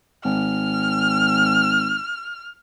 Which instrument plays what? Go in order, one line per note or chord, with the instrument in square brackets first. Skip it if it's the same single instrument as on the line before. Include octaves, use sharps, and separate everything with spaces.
[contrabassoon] G#1 [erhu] F6